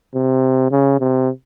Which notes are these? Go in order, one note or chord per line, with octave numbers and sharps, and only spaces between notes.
C3
C#3
C3